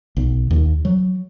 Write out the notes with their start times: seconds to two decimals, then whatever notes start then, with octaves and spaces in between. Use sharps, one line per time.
0.17 B1
0.51 D#2
0.85 F#3